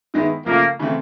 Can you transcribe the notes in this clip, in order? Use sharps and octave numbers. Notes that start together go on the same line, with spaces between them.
D#3 G#3 B3 E4
C#3 F3 A3 A#3
C#3 E3 A3 C4